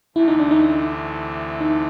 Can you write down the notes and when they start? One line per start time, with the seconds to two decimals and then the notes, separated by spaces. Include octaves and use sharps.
0.15 D2 C3 E3 A3 E4
0.28 D#4
0.39 D4
0.51 D#4
1.61 D#4